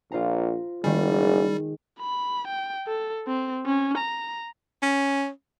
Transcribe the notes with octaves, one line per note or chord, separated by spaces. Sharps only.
A#1 F4 C5 A#5
F#1 D#3 G3 G#3 G#4
B5
G5
A4
C4
C#4
A#5
C#4